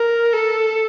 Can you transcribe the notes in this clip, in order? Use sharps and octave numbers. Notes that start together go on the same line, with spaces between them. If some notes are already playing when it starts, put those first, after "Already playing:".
Already playing: A#4
A4